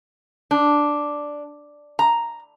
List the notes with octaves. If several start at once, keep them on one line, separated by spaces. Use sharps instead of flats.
D4
A#5